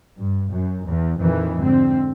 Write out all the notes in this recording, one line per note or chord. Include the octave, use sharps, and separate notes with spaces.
G2
F#2
E2
F2 A#2 D#3 E3
G#2 D3 C4